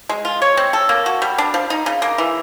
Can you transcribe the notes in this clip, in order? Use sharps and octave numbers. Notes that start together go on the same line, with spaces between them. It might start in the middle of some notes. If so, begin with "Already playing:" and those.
G#3
F4
C#5
C4
A4
A#3
F#4
G3
D4
F3
D#4
C#3
A#3
E3